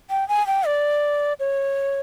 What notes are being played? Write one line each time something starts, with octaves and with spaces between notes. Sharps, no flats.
G5
G#5
G5
D5
C#5